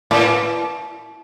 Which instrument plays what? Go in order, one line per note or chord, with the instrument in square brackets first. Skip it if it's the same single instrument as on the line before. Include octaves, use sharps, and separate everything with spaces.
[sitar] A2